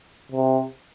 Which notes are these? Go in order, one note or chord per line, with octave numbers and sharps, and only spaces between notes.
C3